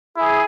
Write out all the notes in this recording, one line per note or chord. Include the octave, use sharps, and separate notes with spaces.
E4 G#4